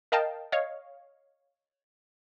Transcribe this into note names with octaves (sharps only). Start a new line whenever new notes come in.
A#4 D#5 F5 G5 A5
C#5 D#5 F5